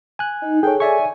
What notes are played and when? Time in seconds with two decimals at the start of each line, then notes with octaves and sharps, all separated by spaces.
0.19 G#5 F#6
0.42 D#4
0.63 G#4 A4 C#5 G5
0.80 D5 E5 G#5 C#6